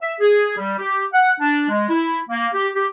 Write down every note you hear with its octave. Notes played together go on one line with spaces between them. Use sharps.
E5
G#4
G3
G4
F#5
D4
G#3
E4
A#3
G4
G4